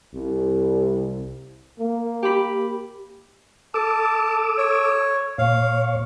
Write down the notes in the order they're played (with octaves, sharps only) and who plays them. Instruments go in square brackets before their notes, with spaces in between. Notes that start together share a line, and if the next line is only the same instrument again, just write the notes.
[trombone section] C2
[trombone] A#3
[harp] G4 B5
[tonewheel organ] A4 D6 E6 [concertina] A5
[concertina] C#5
[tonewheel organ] A#2 C#5 [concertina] F5